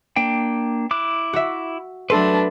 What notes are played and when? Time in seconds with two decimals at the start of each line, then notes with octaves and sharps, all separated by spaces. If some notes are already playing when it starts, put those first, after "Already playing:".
0.16 A#3 D4 G5
0.91 E4 D6 F#6
1.33 F#4 E5
2.10 F#3 A3 D4 A4 B4 B5 C6